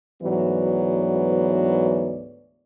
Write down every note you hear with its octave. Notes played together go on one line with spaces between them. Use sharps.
D2 G#2 E3 F#3 B3 D5